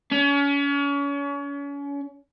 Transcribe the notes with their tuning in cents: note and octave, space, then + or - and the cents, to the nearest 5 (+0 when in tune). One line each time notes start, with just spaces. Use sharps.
C#4 +35